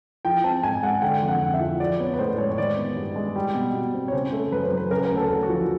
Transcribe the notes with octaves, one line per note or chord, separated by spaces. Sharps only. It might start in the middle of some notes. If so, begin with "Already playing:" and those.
F3 G5
C4 A5
G#2 G#5
G#3 F#5
D3 G5
F2
F#5
F2
E5
F3
F3 D5
B3 C#5
B4
A2 C5
G#3 C#5
C#5
D#3 D5
B3
G2
G#3
G3
B2
B2
C4
C#5
C#3 C5
A3
F#2 B4
C5
F#3
B4
C#3 A#4
B4
A#4
D2
A4
D2
F#4
F3